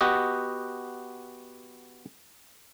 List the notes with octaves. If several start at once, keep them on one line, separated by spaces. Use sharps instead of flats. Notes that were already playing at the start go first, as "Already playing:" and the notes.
B3 F#4 G4 D#5